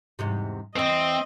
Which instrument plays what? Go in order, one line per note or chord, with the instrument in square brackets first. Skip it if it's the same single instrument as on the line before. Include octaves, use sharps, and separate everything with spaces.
[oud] E2 G#2 C3
[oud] E2 E3 [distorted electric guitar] C4 [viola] D#5